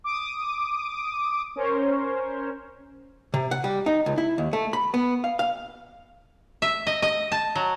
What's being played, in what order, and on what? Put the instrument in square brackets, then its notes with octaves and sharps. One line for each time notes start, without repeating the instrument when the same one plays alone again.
[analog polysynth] D6 D#6
C#4 A#4 C5 C#5
[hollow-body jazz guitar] C3
F#5
G3
D#4
C#2
E4
D#2
A3
B5
B3
F5
F5
[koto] E5
D#5
D#5
A5
F#3